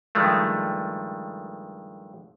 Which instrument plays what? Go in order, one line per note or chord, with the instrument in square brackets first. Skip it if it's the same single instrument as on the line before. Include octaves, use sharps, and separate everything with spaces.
[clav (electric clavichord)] G2 D#3 F3 G#3 A3